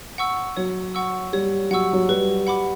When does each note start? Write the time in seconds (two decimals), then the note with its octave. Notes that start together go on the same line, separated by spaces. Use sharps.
0.18 F#5 C#6 E6
0.57 F#3 C#5
0.95 F#5 C#6 E6
1.33 G3 C#5
1.71 F#3 F#5 C#6 E6
1.93 F#3
2.09 G3 B4
2.47 F#5 B5 D6